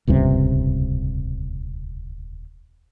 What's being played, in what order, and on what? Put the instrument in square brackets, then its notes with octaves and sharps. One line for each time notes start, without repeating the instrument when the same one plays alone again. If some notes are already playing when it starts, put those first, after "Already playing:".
[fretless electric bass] D#1 C#2 G2 C3